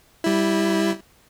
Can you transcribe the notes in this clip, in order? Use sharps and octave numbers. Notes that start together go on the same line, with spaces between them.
G3 E4